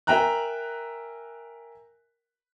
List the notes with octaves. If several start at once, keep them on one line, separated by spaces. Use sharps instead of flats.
A#4 E5 G5 G#5 A#5 F#6